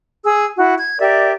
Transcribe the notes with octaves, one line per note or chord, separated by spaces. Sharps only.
G#4 E6
E4 F#4
G#6
G4 A#4 D5 E5